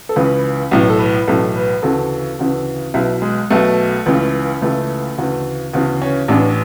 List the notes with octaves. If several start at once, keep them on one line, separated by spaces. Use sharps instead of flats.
A4
C#2 C#3 E3 B4
B1 A2 E3
A4
B4
B1 A2 E3 A4
B4
D2 C#3 E3 A4
D2 C#3 E3
B1 B2 E4
G#3
B1 B2 A3
C#2 C#3 E3
C#2 C#3 E3 A3
D2 C#3 E3
D2 C#3 E3 B3
C#4
A1 A2 E3 D4